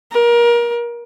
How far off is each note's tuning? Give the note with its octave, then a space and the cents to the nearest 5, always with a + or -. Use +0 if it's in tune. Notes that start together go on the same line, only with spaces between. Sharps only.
A#4 +25